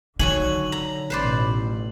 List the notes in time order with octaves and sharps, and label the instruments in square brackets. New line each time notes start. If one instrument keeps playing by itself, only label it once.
[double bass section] D3 [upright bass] D#3 [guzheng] F#3 C#5 G#5 [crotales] F#7
[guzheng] A#5
[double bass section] A1 B2 [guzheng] B4 C5 D5